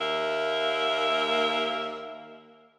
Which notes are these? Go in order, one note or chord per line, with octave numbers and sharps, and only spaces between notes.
D#2 A#3 E5